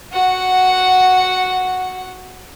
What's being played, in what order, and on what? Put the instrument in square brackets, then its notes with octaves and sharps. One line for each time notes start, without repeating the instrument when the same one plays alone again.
[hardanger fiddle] F#4 F#5